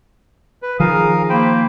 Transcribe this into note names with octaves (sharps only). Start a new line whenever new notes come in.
B4
D#3 F3 G#4 A#4 F5 D#6
A#3 C5 G5 B5